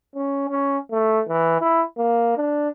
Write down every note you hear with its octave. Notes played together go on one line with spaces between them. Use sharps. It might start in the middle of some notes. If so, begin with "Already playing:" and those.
C#4
C#4
A3
E3
E4
A#3
D4